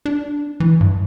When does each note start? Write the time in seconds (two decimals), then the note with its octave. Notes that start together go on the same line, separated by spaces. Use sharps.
0.06 D4
0.60 E3
0.81 G2